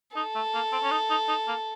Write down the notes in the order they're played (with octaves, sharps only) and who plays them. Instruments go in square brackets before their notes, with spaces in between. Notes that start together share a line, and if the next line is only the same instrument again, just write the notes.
[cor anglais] D#4 [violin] A4
[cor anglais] A3
A#3
C4
C#4
D#4
D#4
D#4
A#3